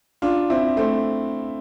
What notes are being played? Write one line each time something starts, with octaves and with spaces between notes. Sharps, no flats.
D4 F4
C4 E4
A3 C4